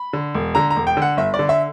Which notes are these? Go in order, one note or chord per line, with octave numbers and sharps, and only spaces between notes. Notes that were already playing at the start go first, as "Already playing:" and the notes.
Already playing: B5
D3
E1
D3 A#5
A#5
E1
G5
D3
F#5
G1 E5
D5
D3
E5